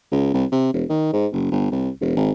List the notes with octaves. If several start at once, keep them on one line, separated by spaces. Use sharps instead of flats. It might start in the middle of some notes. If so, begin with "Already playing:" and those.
C#2
C2
C3
E1
D#3
G#2
F#1
G1
C2
E1
G#1